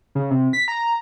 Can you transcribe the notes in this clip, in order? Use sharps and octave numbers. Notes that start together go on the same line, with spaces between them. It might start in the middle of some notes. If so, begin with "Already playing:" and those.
C#3
C3
B6
A#5